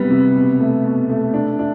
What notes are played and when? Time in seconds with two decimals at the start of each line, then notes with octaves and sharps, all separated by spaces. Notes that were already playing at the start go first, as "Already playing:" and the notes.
Already playing: C3 G3 B3
0.10 C3
0.35 B2
0.60 A3
0.84 B2
1.09 A3
1.34 D4
1.59 D4